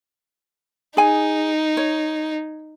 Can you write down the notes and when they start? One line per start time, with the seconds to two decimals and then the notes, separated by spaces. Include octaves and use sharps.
0.97 D#4 G#4 G#5
1.77 C#5